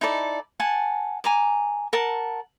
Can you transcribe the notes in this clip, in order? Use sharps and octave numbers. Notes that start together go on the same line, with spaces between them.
D#4 E4 A4 D5
F#5 G#5 A5
G#5 A#5 D6
A#4 F#5 A5